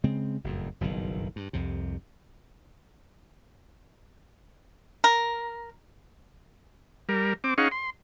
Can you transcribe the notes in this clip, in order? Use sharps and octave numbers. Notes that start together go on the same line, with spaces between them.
C#3 G#3 C4
F#1 F2 A2
F#1 B1 G2 D#3
G2
C2 F2 C3
A#4
G3 A#4
C4 D6
C#4 D#4 G#4 F5 F#5 C#6
C6